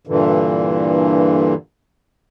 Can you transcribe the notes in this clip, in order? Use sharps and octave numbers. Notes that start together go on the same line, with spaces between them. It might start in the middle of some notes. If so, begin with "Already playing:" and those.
G2 A#2 D3 E3